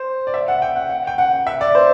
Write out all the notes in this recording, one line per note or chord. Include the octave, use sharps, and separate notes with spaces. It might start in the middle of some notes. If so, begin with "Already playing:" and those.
Already playing: C5
D5
E5
F#5
G5
F#5
F#5
G5
F#5
E5
D5
C5